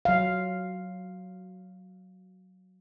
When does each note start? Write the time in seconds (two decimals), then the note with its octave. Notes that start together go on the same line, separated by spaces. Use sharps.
0.05 F#3 F5